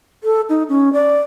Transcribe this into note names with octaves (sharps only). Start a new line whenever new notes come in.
A4
D#4
C#4
D5